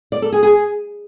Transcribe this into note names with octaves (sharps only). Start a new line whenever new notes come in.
D5
A4
G#4
G#4